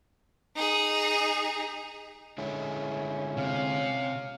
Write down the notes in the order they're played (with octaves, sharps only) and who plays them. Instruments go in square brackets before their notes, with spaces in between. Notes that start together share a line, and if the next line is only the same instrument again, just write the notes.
[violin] D#4 G#4
[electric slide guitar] D3 G#3 E4 [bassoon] C#4
[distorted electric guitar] C3 [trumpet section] F5